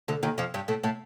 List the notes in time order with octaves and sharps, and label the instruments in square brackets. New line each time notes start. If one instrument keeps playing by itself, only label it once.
[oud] D2 D3
D#2 D#3
F2 F3
G2 G3
A2 A3
A2 A3